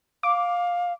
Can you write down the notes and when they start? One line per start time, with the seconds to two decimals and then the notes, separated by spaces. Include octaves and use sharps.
0.23 F5 D6